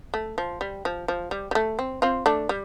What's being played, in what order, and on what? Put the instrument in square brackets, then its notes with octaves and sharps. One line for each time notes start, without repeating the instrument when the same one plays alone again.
[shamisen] A3
F3
G3
F3
F3
G3
G3
A3
C4
C4 F4
A3 D4
G3